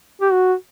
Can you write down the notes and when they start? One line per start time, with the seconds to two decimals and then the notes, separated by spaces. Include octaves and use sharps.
0.21 G4
0.32 F#4